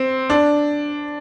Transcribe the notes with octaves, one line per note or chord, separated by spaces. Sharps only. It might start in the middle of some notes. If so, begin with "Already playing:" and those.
Already playing: C4
D4